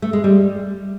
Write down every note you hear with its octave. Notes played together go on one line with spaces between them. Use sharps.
A3
G#3
G3